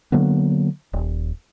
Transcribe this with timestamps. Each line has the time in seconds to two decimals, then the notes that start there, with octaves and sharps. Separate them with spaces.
0.12 D3 F#3 A#3 B3
0.93 D#1